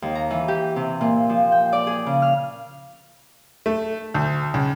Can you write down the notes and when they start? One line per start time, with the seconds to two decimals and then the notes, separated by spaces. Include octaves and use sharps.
0.02 D#2
0.15 A#5
0.30 E3
0.48 G4
0.76 C3
1.01 A#2
1.29 F3
1.52 G5
1.73 D5
1.87 G#4
2.06 C#3
2.22 F6
3.66 A3
4.14 D2
4.54 C#2